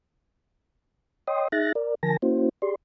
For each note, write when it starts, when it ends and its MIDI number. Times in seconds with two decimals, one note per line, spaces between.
1.27 1.48 73
1.27 1.48 75
1.27 1.48 79
1.27 1.48 84
1.27 1.48 87
1.52 1.72 63
1.52 1.72 68
1.52 1.72 76
1.52 1.72 90
1.52 1.72 93
1.52 1.72 94
1.75 1.95 70
1.75 1.95 74
2.03 2.17 50
2.03 2.17 53
2.03 2.17 70
2.03 2.17 80
2.03 2.17 81
2.03 2.17 94
2.22 2.49 58
2.22 2.49 61
2.22 2.49 64
2.22 2.49 66
2.22 2.49 72
2.62 2.75 67
2.62 2.75 68
2.62 2.75 74
2.62 2.75 84